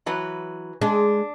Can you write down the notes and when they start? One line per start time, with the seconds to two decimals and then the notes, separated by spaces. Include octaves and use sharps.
0.06 E3 F#3 B4
0.81 G#3 D4